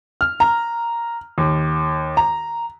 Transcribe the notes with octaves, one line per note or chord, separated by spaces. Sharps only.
F6
A#5
D#2
A#5